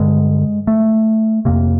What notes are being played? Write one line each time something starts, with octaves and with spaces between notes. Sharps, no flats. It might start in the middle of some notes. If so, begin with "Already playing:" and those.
Already playing: G2 D3 G#3
A3
F2 C3 A#3